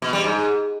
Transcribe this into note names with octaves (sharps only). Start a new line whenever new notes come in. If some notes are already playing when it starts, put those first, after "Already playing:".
B2
G3
G#2